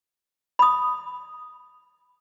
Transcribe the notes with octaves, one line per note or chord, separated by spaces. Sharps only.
B5 D#6